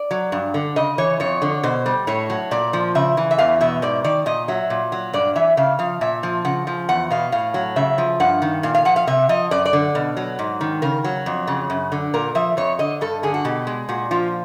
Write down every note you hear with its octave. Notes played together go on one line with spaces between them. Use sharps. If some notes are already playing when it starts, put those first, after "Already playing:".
Already playing: D5
F#3
G2
D3
C#3 D#5
E3 C#5
F2 C#5
D3
B2 C5
G3
A2 C#5
F#3
A#2 D5
F3
C#3 E5
E3
E5
E2 F5
B2 E5
G#2 D5
D#3 D5
A#2 D#5
F#3 E5
A#2
F#3
G2 D5
E3 E5
C#3 F5
F3 F5
A#2 E5
F3
C#3 F#5
F3
E2 F#5
B2 F5
A2 F5
F#3
C#3 E5
F3
G2 F#5
D#3
A#2 F5
F5
F3 F#5
F5
C3 E5
F3 D#5
F#2 D5
D5
D3
B2
F#3
G#2
D#3
C#3 A#4
F#3
F2
C#3
F#2
D3
A#2 A#4
F3 E5
F2 C#5
D3 D#5
G2 A4
D3 G#4
F#4
B2 G4
G#3
A#2 F#4
F3 F4